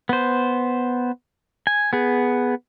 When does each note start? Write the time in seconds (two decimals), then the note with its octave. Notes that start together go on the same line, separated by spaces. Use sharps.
0.09 B3 C5
1.67 G#5
1.93 B3 G#4